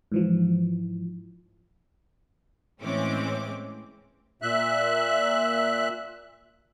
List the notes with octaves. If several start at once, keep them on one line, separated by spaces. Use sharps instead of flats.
G#2 E3 F3
A2 E3 G#3 C4 C#4 D6
A#2 E5 F#6